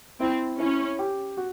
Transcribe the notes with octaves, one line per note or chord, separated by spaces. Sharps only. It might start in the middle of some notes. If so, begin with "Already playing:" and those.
C4 E4
C#4 E4
G4
F#4